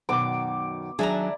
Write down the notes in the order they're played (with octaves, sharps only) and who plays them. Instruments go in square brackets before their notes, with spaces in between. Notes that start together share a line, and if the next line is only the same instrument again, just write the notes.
[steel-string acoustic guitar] F#2 B2 D#3 [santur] D6
[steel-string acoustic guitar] D#3 A5 [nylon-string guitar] F#3 D4 G#4 [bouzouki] E4 D5 A#5